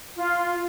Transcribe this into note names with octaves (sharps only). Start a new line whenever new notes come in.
F4